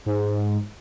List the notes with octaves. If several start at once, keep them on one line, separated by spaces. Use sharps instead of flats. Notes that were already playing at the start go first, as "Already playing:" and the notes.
G#2